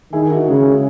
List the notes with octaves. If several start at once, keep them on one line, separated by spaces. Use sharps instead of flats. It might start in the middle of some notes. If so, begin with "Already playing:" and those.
D#3 E4 G#4
D#4 F#4
C#3 G#3